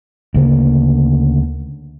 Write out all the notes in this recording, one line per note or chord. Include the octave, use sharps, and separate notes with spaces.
D2 C#3 A#3